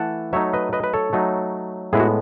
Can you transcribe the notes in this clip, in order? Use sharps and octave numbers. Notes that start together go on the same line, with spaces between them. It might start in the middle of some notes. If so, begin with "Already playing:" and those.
Already playing: E3 A3 E4 F#5 A5
F#3 A3 D#4 C#5 E5
B4 D#5
B4 D#5
B4
A4 C#5
F#3 A3 D#4
A2 G#3 B3 E4 G#4
F#4